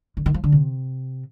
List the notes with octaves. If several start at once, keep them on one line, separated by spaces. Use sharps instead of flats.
D3
D#3
F3
D3
C3